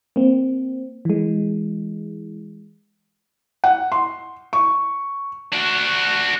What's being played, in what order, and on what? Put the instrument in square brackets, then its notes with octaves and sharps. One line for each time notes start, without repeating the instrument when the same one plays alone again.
[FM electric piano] A#3 C4
E3 G#3
[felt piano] F#5
C6
C#6
[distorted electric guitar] D4 F#4